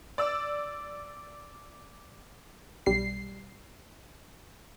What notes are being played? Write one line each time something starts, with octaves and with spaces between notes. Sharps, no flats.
D5 E6
B1 G3 C7